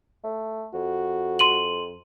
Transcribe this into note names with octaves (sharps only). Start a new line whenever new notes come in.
A3
F2 F#4
C6 D#7 F#7